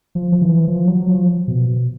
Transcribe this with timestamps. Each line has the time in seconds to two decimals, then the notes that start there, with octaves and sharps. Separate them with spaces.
0.15 F3
0.32 F3
0.42 E3
0.68 F3
0.87 F#3
1.08 F3
1.48 B2